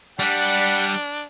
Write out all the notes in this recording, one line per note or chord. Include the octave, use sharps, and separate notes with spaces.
G3 D4 F#5